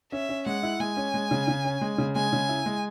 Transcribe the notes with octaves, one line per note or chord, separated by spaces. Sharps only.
C#4 E5
C#4
G#3 F#5
E4
G#3 G#5
C#4
G#3
C#3
C#3
C#4
G#3
C#3
G#3 G#5
C#3
E4
G#3